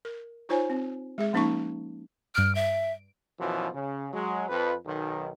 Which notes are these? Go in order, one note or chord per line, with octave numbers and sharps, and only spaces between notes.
A#4
D#4 F4 C5 C#5 G#5
C4
G#3 G#4 E5
F3 A#3 C#4 D#4 A5 C#6
G2 F6 D7
E5
F#2 B2 E3 F3
C#3
F#3 G#3
F2 B4
B1 D#3